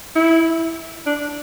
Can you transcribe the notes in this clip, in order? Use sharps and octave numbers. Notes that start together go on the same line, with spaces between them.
E4
D4